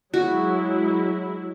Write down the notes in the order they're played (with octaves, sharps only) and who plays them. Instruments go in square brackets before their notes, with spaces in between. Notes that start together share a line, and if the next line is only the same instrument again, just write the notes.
[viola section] F#3 G#3 E4 [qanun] F#4